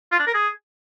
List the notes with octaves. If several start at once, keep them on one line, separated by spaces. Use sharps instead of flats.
F4
D4
A#4
G#4